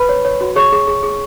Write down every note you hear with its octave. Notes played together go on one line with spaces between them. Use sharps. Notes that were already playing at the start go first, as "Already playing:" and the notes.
Already playing: B4 B5
C#5
C#5
F#4
G#4 C#5 C#6
G#4
G#4
G#4